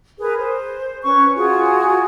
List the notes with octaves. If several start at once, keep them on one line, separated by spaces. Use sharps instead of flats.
G#4 A#4 B4
C5
C#4 B4 C#6
F4 F#4 G#4